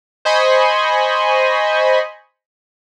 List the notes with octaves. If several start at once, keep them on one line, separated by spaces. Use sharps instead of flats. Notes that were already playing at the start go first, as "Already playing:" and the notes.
C5 D#5 G#5 B5 C#6